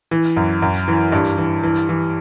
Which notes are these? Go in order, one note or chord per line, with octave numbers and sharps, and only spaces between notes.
E3
F#2
F#2
E3
G2
E3
E3
E3